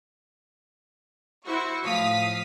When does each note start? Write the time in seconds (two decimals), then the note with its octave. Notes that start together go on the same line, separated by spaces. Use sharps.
1.46 E4 F#4 C5 C#6
1.83 A2 F3 F5 D#6 B6